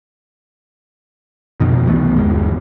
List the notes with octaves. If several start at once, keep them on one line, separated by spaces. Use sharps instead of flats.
F2 B2 D#3
C2 E3 A3 B3
G1 D#2 G#3